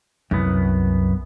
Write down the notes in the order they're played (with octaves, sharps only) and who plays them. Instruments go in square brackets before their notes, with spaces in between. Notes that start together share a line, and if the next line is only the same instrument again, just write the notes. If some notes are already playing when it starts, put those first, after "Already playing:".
[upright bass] C2 [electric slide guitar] F#2 B3